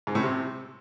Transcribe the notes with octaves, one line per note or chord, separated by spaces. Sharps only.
G#2
A2
C3